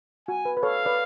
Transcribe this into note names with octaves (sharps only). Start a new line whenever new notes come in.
F#4 G#5
B4
B4
A4 C#5 F5
B4 D5